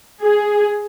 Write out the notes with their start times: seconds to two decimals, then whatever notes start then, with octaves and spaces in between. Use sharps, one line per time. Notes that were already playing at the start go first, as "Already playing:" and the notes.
0.22 G#4